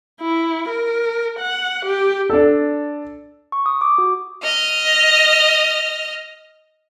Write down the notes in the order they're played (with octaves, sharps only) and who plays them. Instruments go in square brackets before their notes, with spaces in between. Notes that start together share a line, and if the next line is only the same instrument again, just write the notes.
[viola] E4
A#4
F#5
G4
[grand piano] D4 A4
[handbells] C#6
D#6
D6
F#4
[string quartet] D#5 F6